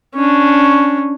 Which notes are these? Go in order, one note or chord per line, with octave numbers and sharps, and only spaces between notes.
C#4 D4